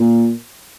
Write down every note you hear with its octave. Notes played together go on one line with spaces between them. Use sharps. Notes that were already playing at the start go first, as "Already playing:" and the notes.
Already playing: A#2